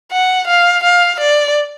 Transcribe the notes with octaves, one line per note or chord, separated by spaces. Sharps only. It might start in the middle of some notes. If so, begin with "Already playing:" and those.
F#5
F5
F5
D5